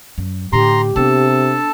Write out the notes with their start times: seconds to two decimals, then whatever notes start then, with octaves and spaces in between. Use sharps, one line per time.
0.18 F#2
0.53 A2 D3 G4 A#5 C6
0.96 C3 B3 D4 A4 A5